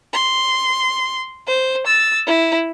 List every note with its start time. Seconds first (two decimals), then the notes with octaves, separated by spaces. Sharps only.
0.14 C6
1.47 C5
1.87 E6 A6
2.26 E4